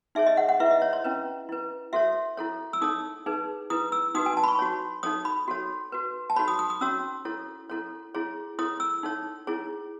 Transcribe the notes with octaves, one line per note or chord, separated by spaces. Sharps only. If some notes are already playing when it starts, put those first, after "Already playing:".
D#4 G#4 C#5 E5
D#5
F#5
F#5
E4 B4 E5
D#5
C#5
C#5
C#4 E4 B4
E4 B4
F#4 A4 C#5 E5
E4 A4 C#5
E6
D#4 A4 C#5 D#6
D#4 G#4 B4
E4 B4 D#6
E6
D#4 F#4 B4 D#6
G#5
A5
B5
C#6
F#4 C#5
D#4 A4 C#5 D#6
B5
F#4 A4 C#5
F#4 B4
A5
D#4 F#4 A4 C#5 B5
D#6
D#6
D#6
C#4 F#4 C#5 E6
E4 A4 C#5
E4 A4 C#5
E4 G#4 C#5
E4 A4 C#5 D#6
E6
D#4 A4 C#5
E4 G#4 C#5